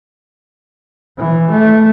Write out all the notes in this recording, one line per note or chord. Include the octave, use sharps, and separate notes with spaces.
E3
A3